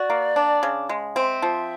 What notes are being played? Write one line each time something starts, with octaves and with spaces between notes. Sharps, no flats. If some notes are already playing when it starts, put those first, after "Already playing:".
Already playing: F#4 D5
A#3
D4
C#3
G#3
C4 E5
F3